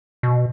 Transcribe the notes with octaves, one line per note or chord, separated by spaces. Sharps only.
B2